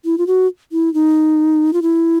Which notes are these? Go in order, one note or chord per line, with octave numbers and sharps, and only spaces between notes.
E4
F4
F#4
E4
D#4
F4
E4